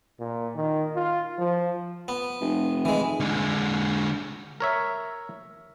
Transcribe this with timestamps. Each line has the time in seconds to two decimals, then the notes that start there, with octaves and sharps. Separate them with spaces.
0.20 A#2
0.55 D#3
0.96 F4
1.39 F3
2.08 B3
2.41 F1
2.85 E3 G#3
3.20 D3 G#3
4.60 A#4 C#5 E5